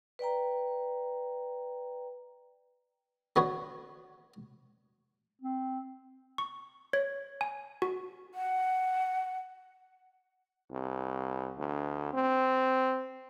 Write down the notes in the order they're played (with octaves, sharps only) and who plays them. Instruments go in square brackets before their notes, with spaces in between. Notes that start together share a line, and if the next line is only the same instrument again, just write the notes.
[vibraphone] B4 D5 G5 A#5
[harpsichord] D3 B3 F#4 C#5
[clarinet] C4
[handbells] C#6
C#5
G#5
F#4
[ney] F#5
[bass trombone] C2
D2
C4